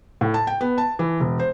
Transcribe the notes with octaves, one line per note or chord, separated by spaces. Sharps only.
A2
A5
G5
B3
A5
E3
E1
C5